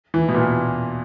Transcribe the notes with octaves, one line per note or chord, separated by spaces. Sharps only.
E3
B2
A#2